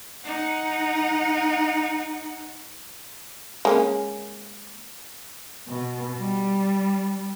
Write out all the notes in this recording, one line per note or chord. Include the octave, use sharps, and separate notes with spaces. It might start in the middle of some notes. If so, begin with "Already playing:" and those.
D#4 F#5
G#3 A#3 C#4
B2
G3